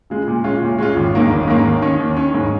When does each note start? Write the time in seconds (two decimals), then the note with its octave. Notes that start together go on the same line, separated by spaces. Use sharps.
0.10 C#3 G#3 F4
0.28 A#2
0.44 G#3 C#4 F4
0.62 A#2
0.78 G#3 C#4 F4
0.96 G#1
1.14 G#2 D#3 A#3 C#4
1.30 G#1
1.48 G#2 D#3 A#3 C#4
1.65 D#2
1.82 D#3 C#4
2.00 D#2
2.17 D#3 C#4
2.34 G#2